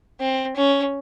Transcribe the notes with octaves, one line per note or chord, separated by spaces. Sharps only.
C4
C#4